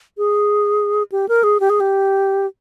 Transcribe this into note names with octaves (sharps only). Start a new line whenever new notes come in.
G#4
G4
A#4
G#4
G4
G#4
G4